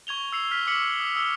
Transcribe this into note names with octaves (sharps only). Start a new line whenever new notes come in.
C#6 G#6 F7 G7
E6 C7 F7
F6 B6
C#6 D6 F6 B6 C#7 F#7
D#6
D#6 E6 G7